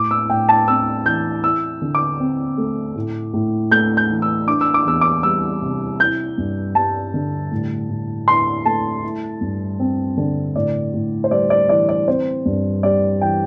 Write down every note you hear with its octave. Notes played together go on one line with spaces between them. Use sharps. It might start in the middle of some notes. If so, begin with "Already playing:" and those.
Already playing: A2 D6
E6
A2 G5
A5
C4 E6
E3 G6
E4 E6
D3
D6
C4
A3
A2
A2
A3 G6
G6
E3
E6
D4 D6
E6
D6
E2 E6
D6
G3 E6
C3
E4 G6
G2
G3 A5
D3
A2
A2
E4 C6
A3 A5
E4
G2
C4
D3
A2 D5
A2
C5
G3 D5
D5
E3 D5
D5
C4 C5
G2
G3 D5
E3 G5